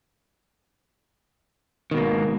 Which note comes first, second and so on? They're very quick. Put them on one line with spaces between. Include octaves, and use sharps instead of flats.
D#3 B2 A#3 G#2